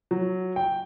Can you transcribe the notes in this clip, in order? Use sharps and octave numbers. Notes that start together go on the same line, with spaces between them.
F#3
G5